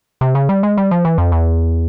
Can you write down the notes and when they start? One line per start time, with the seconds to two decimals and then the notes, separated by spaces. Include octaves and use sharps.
0.21 C3
0.35 C#3
0.49 G3
0.63 G#3
0.77 G3
0.91 F3
1.05 E3
1.18 F2
1.32 E2